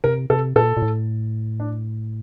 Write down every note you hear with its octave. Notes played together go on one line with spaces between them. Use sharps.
C3 A#4
C3 A4
A#2 A4
A#2
A2
D4